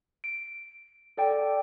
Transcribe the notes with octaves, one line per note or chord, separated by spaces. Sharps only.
D7
A4 D5 G5